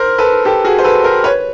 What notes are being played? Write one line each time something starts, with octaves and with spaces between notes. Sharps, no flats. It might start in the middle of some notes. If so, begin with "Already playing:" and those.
Already playing: A#4 C5
A4 B4
G4 A4
F#4 G#4
C5
A4 B4
A#4 C5
B4 C#5